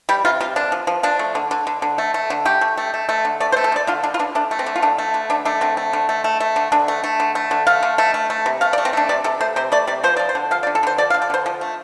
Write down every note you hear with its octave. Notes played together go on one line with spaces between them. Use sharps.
G3 G4
C3 F4
C3 F4
D3 D4
F3
F3
F3 D4
A3
D3
D3
D3
D3
A3
A3
D3
A3 G4
A3
A3
A3
A3
D3
A3 D5
C5
A3
A4
D3 D5
D3 F4
D3 D4
F4
D3 D4
A3 D4
A3
C4
D3
F4
D3 D4
A3
D3
D3 D4
A3 D4
D3 C4
A3
D3
A3
A3
A3
D3
D3 D4
A3
A3
D3
A3
D3
A3 F5
D3
A3
A3
A3
C3
A3 F5
D5
A3
C4
A3 D4
C3 D5
C3 A4
A3 C5
C3 C5
A3 D5
C3 D5
F3 C5
F3 D5
C5
D3
F3 F5
D5
D3
A4
D3 C5
F3 D5
F5
D3
D5
D3 C5
F3
A3